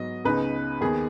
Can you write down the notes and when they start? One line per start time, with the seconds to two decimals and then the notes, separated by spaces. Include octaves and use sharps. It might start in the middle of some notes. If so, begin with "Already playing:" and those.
Already playing: G#2 F#3 B3 D#5
0.25 C#2 C#3 B3 D#4 B4
0.81 D#2 D#3 B3 G#4